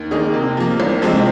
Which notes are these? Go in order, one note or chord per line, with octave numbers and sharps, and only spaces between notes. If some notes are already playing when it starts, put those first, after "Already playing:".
Already playing: D#2
D#3 A#3 D#4 G#4
C3
F3 A#3
C2
C3 F3 G#3 C4